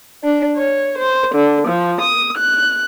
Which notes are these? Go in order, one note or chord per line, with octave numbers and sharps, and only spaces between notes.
D4
C#5
C5
D3
F3
D#6
F#6